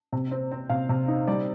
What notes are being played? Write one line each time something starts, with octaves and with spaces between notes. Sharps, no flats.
C3
C4
C4
C3 F5
C3
D#4
G3 D5